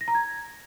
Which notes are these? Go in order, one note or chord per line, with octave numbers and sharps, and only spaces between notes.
A#6
A#5
G#6